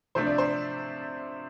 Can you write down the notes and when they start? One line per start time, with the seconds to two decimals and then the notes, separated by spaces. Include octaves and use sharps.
0.15 C3 F3 A3 D4 C5
0.27 D5
0.38 C5